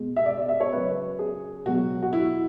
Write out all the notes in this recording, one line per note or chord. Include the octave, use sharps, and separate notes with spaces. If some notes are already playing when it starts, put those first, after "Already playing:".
Already playing: B2 G#3
E5
D5
D5
E5
C#5
C#3 F#3 B4
G#4
B2 F#3 F#4
F#4
E4